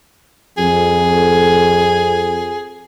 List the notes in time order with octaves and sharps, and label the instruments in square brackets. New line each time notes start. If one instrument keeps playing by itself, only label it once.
[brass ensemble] F2 [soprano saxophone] G#4